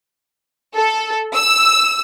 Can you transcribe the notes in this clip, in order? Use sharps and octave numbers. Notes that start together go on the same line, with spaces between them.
A4
E6